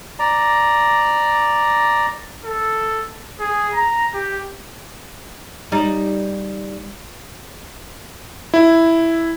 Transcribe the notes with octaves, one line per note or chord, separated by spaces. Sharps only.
D5 A#5
A4
G#4
A#5
G4
G3 D#4
E4